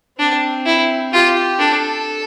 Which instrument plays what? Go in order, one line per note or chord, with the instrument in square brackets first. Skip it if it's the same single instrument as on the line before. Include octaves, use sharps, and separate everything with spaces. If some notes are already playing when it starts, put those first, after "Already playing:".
[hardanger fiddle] C4 [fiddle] D4
[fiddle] E4
[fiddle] F4 [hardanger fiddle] G4
[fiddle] D4 [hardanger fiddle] A4